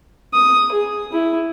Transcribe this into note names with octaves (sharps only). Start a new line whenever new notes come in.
D#6
G#4
E4